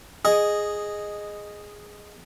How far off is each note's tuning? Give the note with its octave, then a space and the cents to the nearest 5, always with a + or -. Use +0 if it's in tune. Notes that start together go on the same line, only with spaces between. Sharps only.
G#4 +0 D#5 -10